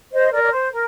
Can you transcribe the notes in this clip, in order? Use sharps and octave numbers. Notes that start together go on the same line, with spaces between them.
C5 D#5
A#4 D5
D5
C5
A#4